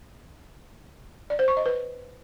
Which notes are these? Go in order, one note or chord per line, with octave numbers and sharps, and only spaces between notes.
D5
C5
C#6
D#5
B4